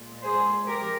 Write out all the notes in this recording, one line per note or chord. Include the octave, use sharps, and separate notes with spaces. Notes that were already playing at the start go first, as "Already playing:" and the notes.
Already playing: A#2 G#3
G#4 C5
F2 G4 A#4